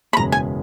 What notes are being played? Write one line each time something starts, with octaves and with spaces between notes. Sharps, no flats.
B5
F#1 E2 B2 G#3 C#4 A#5
G#5